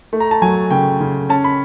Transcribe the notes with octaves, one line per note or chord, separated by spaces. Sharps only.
A3
A#5
A5
F#3 G#5
C#3 G5
C#3
C#4 A5
B5